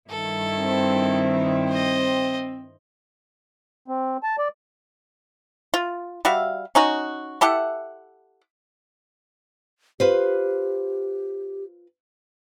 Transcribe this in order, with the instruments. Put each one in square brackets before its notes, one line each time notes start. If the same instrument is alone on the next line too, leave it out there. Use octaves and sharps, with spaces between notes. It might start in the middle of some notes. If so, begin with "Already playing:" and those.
[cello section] G2 D#3 E4 [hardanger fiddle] A4
[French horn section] C4
[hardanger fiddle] C5 D#5
[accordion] C4
A5
D5
[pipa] F4
G3 F#4 E5 F5
C#4 D#4 F#4
E4 G4 A4 F#5
[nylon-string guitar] F4 B4 C5 [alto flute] G4